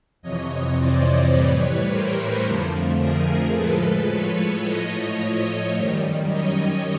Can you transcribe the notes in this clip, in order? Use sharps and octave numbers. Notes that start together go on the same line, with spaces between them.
F2 C3 E3 C#5 D#5
C5 D5
A2 E3 G3 B4 C#5
A#4 C5
F2 D3 F3 A3
G#4 A#4
A2 F3 G#3 A4 B4
B4 C#5
A2 F3 A3 C#5 D#5
F#2 D#3 G3
C#5 D#5